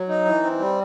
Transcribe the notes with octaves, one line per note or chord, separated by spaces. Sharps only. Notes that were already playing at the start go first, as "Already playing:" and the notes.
Already playing: F#3
D#4
E3
C4
G3